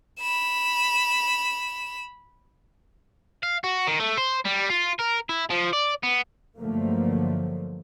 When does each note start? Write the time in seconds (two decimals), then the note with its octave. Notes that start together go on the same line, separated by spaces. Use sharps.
0.20 B5 E7
3.43 F5
3.64 F#4
3.87 D#3
4.00 A3
4.18 C5
4.45 G3
4.70 F4
5.00 A#4
5.29 E4
5.50 F3
5.73 D5
6.03 B3
6.59 G2 D3 F3 F#3 A3 A#3